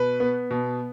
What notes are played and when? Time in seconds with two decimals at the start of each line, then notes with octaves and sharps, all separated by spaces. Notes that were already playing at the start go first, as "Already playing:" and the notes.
Already playing: B2 B4
0.20 B3
0.51 B2